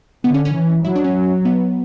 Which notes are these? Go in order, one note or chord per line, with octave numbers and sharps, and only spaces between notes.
D3 B3
C#4
C#4
E3
F#3 E4
D4
C#4
B3